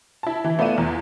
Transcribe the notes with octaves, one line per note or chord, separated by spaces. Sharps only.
E4 A5
E3
A3 B3 F4 D5 D#7 E7
E2